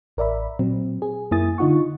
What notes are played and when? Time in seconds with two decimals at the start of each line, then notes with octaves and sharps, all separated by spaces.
0.17 A1 A#4 D5 E5 B5
0.59 A#2 F#3 C4
1.02 G#4
1.31 F#2 A#3 E4 G#5 D#6 A6
1.58 D3 D#4 F4 F#5 C#6